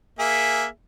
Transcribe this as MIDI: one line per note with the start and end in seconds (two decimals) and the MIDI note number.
0.19 0.66 58
0.19 0.66 68
0.19 0.66 76